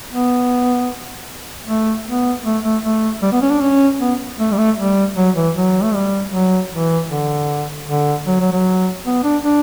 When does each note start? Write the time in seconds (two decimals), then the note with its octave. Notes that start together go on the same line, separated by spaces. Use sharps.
0.11 B3
1.67 A3
2.06 B3
2.45 A3
2.64 A3
2.83 A3
3.22 G3
3.32 B3
3.41 C#4
3.51 D4
3.61 C#4
4.00 B3
4.39 A3
4.51 G3
4.57 A3
4.77 G3
5.16 F#3
5.35 E3
5.55 F#3
5.83 A3
5.94 G3
6.32 F#3
6.71 E3
7.10 D3
7.88 D3
8.27 F#3
8.40 F#3
8.52 F#3
9.05 B3
9.23 D4
9.43 D4